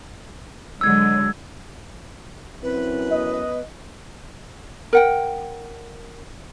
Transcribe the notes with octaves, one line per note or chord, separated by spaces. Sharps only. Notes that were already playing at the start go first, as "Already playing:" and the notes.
D3 F#3 G#3 E6 G#6
F#2 C4 E4 B4
B3 D#5
A#4 F#5 G5